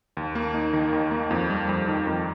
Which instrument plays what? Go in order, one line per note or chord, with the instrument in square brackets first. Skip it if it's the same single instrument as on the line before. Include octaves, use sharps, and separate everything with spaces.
[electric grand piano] D#2
A#3
D#4
D#3
D#2
A#3
F2
G3
F2
D#3
F2